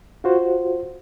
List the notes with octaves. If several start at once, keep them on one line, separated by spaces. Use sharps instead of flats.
F4 F#4 C5